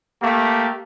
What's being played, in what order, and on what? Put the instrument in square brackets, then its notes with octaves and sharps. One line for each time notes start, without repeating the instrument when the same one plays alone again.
[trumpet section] A3 A#3 G4